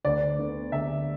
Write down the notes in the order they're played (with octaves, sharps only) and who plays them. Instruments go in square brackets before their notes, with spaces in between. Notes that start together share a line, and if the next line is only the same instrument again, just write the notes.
[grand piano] D2 [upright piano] D5
[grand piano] D3 B3
[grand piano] D2 [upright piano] E5